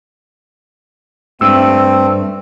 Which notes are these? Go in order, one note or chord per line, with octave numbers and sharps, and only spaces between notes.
G2 A3 C4 E6